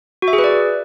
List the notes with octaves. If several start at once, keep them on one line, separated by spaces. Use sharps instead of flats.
F#4
E5
G#4
B4
D5